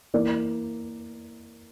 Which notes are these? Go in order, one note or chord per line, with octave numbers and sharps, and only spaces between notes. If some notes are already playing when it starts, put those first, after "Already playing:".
E3 A#3 E4 A#4 D5